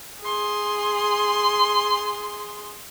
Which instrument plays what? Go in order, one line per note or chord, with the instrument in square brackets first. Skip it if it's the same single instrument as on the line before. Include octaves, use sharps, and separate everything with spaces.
[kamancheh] G#4 C6